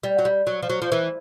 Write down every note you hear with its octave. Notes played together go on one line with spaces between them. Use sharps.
G3
F#3
G3
F#3
F3
F#3
F3
E3